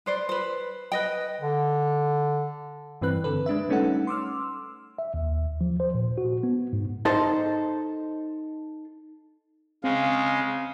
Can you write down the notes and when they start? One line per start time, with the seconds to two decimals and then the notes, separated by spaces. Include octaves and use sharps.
0.06 B4 C5 D5
0.29 B4 C5
0.92 B4 D#5 G5
1.41 D3
3.02 G2 E3 C4 B4 F#6
3.24 D3 A4 B4
3.46 G#3 D4 B4 E5
3.69 G3 A3 C#4 D#4 A4 F#5
4.07 C6 D6 E6 F6
4.98 E5
5.14 D#2
5.61 F3
5.80 C5
5.94 A#2
6.18 F#4
6.43 B3
6.73 G#2
7.05 D#4 A4 C5
9.84 C#3 G#3 C4 F5